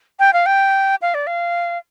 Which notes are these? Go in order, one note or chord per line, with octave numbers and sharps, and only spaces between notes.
G5
F5
G5
F5
D5
F5